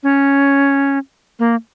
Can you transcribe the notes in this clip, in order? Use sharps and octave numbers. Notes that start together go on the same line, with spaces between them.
C#4
A#3